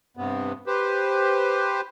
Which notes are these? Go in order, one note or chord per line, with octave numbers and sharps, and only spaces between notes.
G2 C3 B3
G4 B4 C5